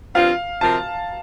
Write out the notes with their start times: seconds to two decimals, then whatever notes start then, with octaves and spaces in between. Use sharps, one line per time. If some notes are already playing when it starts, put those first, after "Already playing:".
0.15 G2 F3 C4 F4 F5
0.61 C3 F3 C4 F4 A#4 A5